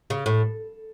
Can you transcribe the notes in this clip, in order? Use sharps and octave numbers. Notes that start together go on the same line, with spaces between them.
C#3
A2